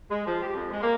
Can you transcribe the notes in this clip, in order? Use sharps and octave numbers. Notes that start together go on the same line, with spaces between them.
G#3
F3
G4
F2
G#3
A#3